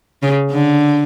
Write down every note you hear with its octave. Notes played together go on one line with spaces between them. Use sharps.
C#3
D3